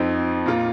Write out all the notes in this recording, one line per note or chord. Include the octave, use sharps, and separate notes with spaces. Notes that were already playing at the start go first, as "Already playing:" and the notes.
Already playing: F2 F3 C4 D#4
A#2 A#3 F4